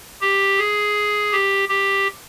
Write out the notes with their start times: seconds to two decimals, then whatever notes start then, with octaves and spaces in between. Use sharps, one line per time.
0.21 G4
0.58 G#4
1.32 G4
1.69 G4